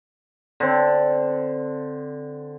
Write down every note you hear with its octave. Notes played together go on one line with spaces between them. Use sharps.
D3 C4